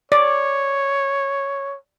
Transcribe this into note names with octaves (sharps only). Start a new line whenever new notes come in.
C#5 D5